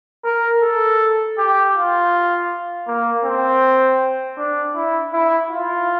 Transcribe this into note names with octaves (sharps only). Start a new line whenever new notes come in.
A#4
A4
G4
F4
A#3
C4
D4
E4
E4
F4